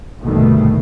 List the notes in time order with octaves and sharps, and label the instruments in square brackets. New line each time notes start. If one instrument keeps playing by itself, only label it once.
[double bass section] A#1 G2 B2 D3 D#3 A3